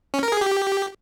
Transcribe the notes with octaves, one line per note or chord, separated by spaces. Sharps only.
C#4
A#4
G#4
G4